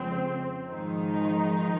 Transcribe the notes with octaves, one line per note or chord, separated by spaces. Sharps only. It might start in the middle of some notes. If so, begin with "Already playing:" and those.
Already playing: F2 C#3 G#3 C4
G#2 D#3 F3 G#3 D#4